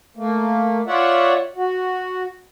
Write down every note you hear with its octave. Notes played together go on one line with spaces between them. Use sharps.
A3 A#3
F4 C#5 D5 E5 F#5
F#4